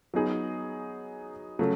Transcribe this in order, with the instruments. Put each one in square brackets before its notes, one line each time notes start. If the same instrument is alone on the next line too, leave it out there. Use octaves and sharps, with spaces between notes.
[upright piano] F#3 B3 D#4 G#4
C#3 F#3 A3